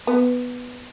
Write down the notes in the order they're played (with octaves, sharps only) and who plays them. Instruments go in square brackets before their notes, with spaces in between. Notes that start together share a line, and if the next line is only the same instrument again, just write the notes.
[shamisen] B3